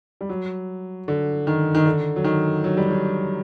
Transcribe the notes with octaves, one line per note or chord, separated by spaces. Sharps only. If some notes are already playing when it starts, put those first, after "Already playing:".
G3
F#3
D3
D#3
D#3
D3
F#3
D#3
F#3
G3
F#3